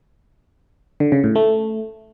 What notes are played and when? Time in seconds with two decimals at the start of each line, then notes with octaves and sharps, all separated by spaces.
1.00 D3
1.12 C#3
1.24 A2
1.35 A3